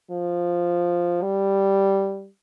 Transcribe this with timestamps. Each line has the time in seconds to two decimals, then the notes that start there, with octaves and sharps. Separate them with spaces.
0.11 F3
1.22 G3